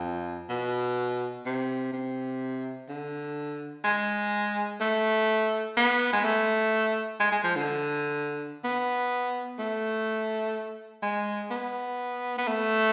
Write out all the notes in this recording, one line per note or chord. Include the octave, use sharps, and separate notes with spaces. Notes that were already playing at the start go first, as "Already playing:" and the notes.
Already playing: F2
B2
C3
C3
D3
G#3
A3
B3
G#3
A3
G#3
G#3
F3
D3
B3
A3
G#3
B3
B3
A3